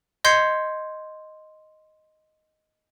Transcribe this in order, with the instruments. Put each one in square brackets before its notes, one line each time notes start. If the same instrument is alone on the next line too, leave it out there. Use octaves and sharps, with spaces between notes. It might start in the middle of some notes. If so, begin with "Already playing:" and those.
[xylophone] D#5 C6 G6 G#6 C7 C#7